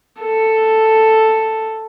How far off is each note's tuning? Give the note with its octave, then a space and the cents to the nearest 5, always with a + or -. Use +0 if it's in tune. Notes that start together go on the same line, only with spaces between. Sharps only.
A4 +5